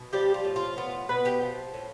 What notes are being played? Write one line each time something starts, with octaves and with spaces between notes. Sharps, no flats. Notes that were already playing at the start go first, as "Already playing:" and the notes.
Already playing: B2
F3 G3 G4
F4
A2
F4
B3 F4
B2 B3 B4
G4 G5
F3
A2